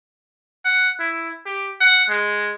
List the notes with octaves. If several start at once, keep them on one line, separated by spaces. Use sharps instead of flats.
F#5
E4
G4
F#5
G#3